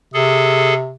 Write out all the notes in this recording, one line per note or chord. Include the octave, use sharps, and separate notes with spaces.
C3 G#4 A4